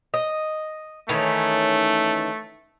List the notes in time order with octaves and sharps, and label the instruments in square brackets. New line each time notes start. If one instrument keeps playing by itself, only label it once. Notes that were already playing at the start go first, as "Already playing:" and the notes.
[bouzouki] D#5
[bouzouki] D#3 E3 C#4 [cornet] A3